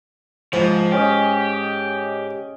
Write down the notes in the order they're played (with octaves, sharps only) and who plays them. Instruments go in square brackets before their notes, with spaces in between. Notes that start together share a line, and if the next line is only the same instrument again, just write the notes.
[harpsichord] G#2 [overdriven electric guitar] F3 [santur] G#5
[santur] C#4 D#5 [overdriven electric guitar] G4